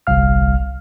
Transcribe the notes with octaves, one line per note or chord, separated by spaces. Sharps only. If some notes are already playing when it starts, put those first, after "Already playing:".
G1 C2 F5 F6